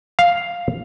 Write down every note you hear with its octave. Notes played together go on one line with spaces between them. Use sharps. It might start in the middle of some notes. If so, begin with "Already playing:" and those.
F5